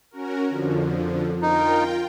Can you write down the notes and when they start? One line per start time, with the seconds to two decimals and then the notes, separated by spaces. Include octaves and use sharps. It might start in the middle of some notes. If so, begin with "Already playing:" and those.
0.11 C#4 F#4 A#4
0.49 F2 D3 F3
1.42 D#4 F4 A#4 G5